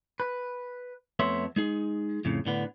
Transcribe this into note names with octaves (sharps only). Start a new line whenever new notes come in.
B4
F2 A3 B3 C#5 E5 C6
G#3 D#4 G#4
F2 A2 C#3
A2 D3 B3